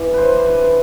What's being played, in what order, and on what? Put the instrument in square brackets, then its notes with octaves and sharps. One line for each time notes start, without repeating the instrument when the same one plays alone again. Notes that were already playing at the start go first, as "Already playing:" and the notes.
Already playing: [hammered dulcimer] E3 D5
G2 B4 C5
B4